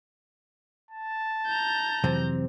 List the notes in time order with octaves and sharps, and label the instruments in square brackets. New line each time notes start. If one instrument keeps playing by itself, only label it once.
[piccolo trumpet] A5
[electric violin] A#5 G6
[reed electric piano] F2 E3 F#3 [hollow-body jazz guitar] C3 C4